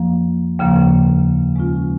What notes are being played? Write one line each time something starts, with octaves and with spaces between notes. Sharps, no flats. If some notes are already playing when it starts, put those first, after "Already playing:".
Already playing: F2 F3 A#3
D#2 C#3 F3 A#3
B2 G#3 C#4 F4